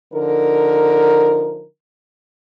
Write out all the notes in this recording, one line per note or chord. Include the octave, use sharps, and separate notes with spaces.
D3 F3 D#4 A#4